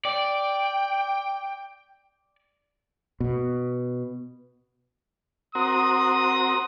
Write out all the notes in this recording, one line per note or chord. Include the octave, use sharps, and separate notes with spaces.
D5 G5
B2
C4 F#4 A#4 D#6